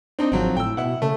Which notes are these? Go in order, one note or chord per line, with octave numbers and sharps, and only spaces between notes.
C4 D4 D#4
G#1 F3 F#3 C4
A2 G5 E6
B2 E4 F#5
C#3 A3